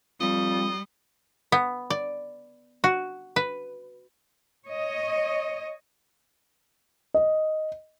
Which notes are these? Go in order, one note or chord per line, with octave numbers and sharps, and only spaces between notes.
F2 G3 D#5
B3
D5
F#4
B4
C#5 D#5
D#5